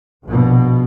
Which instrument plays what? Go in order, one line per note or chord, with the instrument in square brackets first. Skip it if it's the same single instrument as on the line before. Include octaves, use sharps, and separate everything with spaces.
[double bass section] A#1 B2